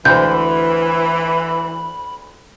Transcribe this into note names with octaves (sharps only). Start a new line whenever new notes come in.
D2 E3 C5 B5 G6